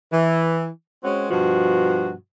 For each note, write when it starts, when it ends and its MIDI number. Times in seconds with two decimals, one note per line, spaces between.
0.12 0.67 52
1.04 1.30 56
1.04 1.30 60
1.04 1.30 61
1.04 1.30 66
1.31 2.12 43
1.31 2.12 47
1.31 2.12 53
1.31 2.12 66